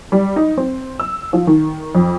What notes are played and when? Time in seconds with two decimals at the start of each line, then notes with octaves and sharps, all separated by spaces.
0.12 G3
0.36 D#4
0.57 C4
1.00 E6
1.33 F3
1.47 D#3
1.95 F2